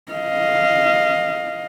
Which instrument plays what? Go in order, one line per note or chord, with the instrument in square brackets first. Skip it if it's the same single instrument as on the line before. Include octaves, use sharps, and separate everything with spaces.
[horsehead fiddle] D#5 F5